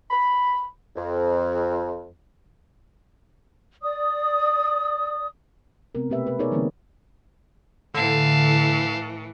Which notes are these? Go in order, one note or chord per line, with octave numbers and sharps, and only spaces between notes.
B5
F2
D5 D#6
C3 G#3 B3 C4 A#4
B2 A3 G4 B4 E5
B4
B3 D#4 G#4 A#4 C#5 D5
D3 E3 G3 A#3 C4 D#4
A2 D3 E3 F5 A5